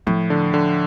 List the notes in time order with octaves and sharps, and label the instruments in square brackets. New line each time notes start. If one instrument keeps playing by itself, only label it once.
[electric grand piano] A2 [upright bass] F3
[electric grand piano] D3
D3